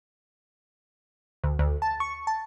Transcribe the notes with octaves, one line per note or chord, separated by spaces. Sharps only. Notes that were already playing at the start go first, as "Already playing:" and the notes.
D2
D2
A5
C#6
A5